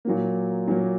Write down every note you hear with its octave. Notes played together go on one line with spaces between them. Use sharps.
A#2 F#3 A#3
A#2 F#3 A#3